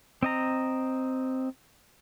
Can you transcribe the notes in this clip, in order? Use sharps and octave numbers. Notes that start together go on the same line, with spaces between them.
C4 D#5 A#5